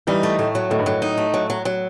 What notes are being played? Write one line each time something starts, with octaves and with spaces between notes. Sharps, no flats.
E3 G3 D#4
A3
A2 A3
F#3
A2 D#3
G2
A2 F#3
D#4
A3
F#3
F#3
F#3